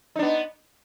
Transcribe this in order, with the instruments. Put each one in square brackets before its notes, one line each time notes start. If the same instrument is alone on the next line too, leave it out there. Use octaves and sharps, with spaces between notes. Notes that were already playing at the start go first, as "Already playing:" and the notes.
[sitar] D#4
D4
B3